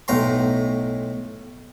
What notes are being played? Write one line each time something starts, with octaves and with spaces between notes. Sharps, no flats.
B1 A2 A#5 C6